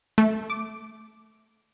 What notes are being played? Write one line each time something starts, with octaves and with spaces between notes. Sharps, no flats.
A3
D6